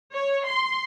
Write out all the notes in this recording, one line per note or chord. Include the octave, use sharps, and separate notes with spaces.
C#5
C6